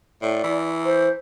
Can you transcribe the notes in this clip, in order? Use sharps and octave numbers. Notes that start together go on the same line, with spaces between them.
A2 D5
E3
C5